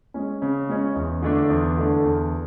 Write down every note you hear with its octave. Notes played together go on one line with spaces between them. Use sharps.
G#3 C#4
C#3
G#3 C#4
E2
D3 A3 D4
E2
D3 A3 D4
E2